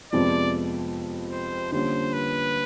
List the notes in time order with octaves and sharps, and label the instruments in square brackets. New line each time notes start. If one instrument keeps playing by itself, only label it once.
[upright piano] F2 C3 F3 G#3 B3 [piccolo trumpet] D5
[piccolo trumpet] C5
[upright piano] D3 G3 A#3 C#4 F4 [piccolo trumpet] C5
[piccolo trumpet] B4